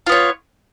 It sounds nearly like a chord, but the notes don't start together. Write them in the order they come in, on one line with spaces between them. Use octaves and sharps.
F4 B3 C#5